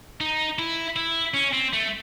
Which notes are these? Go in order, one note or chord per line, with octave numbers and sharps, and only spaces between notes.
D#4
E4
E4
C#4
C4
A3